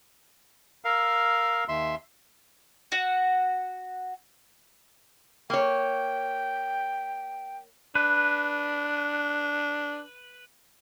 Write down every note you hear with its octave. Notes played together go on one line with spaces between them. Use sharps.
A#4 F5 E6
D#2 E5 C6
F#4 F#5
A#3 C#5 G5
D4 B4